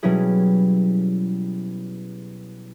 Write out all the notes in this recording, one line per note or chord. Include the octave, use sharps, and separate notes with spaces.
B2 F#3 G3 C#4 E4 G#4